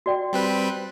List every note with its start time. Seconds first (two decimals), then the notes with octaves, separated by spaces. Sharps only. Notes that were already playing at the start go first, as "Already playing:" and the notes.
0.06 F#4 D5 G5
0.33 G3 C4 B4